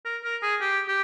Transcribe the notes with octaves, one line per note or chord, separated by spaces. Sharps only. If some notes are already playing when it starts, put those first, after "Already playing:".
A#4
A#4
G#4
G4
G4